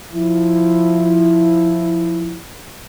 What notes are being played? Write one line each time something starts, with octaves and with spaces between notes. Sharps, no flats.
F3 E4